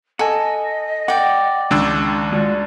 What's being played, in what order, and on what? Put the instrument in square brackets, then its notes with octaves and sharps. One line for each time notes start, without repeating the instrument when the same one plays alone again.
[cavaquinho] A4 [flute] D#5 [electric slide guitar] F#5 G#5
[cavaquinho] D5 G5 [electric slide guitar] F#5
[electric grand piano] C#2 D4 E6 [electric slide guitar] D#3 G#3
[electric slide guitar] G#3 F4 F#4 [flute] D5